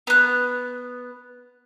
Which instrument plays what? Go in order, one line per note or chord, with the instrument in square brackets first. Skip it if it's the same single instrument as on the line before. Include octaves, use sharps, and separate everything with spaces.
[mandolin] B3 F#6